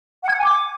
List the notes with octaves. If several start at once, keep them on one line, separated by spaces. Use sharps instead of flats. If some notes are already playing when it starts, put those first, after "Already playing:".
F#5
G#6
F#5
G#5
D6